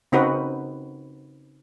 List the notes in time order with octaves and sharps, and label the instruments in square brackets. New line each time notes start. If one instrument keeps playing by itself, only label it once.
[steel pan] C#3 C4 D#4 F#4 A#4 B4